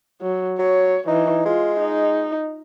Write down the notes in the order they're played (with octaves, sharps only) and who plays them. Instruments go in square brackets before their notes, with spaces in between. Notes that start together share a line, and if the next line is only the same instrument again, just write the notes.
[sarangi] F#3
[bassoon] F#3 [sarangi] C#5
[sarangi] E3 [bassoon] D#4
[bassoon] G#3 [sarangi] F4
[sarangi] D#4